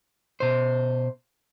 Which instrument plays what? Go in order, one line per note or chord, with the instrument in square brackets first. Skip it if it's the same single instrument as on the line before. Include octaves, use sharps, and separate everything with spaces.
[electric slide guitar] B2 C5